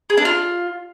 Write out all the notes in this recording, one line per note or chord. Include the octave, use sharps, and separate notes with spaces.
G#4
D4
F4